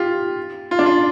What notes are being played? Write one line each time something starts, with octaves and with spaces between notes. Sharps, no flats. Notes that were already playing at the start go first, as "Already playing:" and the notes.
Already playing: F4 G4
F4
D4
F4